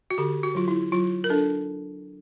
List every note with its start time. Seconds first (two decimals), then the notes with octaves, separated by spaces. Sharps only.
0.11 F#4
0.18 D3 G4
0.43 F#4
0.55 F#3 F4
0.68 E4
0.92 F#3 F4
1.24 A#4
1.30 D4 A4